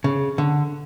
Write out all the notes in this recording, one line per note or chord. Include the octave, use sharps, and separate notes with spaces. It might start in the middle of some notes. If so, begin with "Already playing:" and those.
C#3
D3